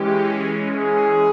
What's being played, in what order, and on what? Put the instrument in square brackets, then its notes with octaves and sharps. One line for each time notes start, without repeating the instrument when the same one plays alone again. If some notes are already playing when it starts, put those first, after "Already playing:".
Already playing: [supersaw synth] E3 G#3 C#4 [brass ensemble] G4
[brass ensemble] G#4